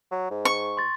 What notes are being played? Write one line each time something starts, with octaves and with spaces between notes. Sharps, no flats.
F#3
G#2
C#6
C6 A6